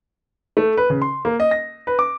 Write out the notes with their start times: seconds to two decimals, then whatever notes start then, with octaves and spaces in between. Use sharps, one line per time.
0.57 A3
0.77 B4
0.90 C#3
1.02 C6
1.25 A#3
1.40 D#5
1.51 A#6
1.87 B4
1.99 D6